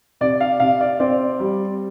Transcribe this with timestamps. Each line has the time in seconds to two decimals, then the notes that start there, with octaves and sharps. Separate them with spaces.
0.21 C3 D5
0.40 F5
0.60 C3 F5
0.81 D5
1.00 C4 D5
1.40 G3